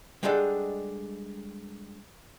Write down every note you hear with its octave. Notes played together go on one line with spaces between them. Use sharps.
G3 G#3 D4 D#4 A4 F#5